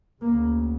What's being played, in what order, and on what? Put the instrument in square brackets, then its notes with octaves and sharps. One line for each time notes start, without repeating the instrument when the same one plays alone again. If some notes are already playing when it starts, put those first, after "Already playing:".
[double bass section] D2 C#3 A#3